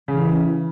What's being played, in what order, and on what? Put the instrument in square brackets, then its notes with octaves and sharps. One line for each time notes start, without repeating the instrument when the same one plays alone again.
[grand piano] C#3 [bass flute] E3